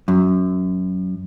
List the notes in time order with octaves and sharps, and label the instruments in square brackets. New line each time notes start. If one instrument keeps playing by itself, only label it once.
[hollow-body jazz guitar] F#2